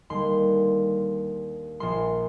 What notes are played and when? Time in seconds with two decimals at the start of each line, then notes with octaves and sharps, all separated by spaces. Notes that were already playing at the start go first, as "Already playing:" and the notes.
0.10 D#2 D3 G3 C6
1.80 A#1 A#2 F3 A#3 C6